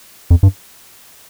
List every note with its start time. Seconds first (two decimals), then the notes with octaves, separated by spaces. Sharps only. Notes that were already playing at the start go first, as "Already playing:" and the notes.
0.30 F2
0.43 G2